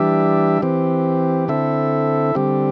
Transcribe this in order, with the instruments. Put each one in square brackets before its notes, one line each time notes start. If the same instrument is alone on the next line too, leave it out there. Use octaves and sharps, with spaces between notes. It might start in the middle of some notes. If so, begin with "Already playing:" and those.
Already playing: [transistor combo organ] E3 G3 D4 G4 E5
E3 C4 G4
D3 C4 E4 A4 E5
D3 G3 C4 G4